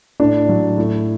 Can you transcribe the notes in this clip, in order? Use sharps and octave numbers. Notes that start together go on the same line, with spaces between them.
A2 D4
F#3
A2